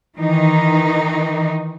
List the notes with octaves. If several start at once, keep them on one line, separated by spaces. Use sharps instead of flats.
D#3 E3 D#4